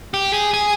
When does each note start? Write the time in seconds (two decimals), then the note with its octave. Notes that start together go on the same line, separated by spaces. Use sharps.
0.14 G4
0.33 G#4
0.54 G#4